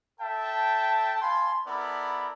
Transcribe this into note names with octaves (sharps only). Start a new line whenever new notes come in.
A4 E5 G5 A5
F5 G#5 A5 B5 C6
B3 E4 A4 A#4 D5 B5